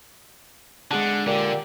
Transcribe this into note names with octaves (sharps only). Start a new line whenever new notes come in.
D3 G#3 G#4 F#5 A5
A#2 D3 G4